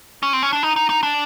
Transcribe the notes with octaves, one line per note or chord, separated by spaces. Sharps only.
C#4
C4
C#4
D4
D#4
D#4
D#4
D4